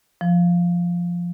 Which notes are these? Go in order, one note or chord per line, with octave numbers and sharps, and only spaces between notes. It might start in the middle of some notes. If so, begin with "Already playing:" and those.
F3